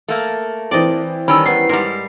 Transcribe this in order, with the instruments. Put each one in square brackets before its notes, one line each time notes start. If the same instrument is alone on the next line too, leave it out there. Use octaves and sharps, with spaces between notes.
[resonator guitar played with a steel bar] A3 A#3
[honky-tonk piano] E3 C4 [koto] D5 D#5
[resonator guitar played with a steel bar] D#3 G3 C#4 [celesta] B5 E6
[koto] B3 [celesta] C7
[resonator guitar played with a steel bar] G#2 G3 [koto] A#4